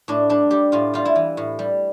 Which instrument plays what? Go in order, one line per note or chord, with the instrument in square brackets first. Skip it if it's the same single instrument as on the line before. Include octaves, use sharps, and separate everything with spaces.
[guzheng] A2 D4
G3 D4
G3 G4
A2 F4
G3 F4
E4
E3
A2
G3